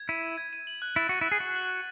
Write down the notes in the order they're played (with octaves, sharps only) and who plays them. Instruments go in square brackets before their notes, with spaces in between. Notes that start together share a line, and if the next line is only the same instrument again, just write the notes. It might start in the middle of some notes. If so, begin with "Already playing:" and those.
Already playing: [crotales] G#6
[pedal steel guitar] E4 [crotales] D#7
[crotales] D#7
G#6
D#7
F#7
F#6
[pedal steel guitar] E4 [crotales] A6
[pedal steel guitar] F#4 [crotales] D#7
[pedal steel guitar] E4
[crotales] F#6
[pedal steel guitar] G#4
[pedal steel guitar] F#4 [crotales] F#6
[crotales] F#6
F#6